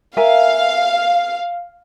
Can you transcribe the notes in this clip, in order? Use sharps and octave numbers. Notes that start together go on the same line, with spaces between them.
A#4 E5 F5 G#5